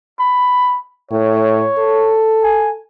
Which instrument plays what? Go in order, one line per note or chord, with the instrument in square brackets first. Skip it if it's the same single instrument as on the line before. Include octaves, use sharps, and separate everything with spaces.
[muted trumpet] B5
[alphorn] A2 [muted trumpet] C#5
[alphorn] A4
[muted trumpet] G#5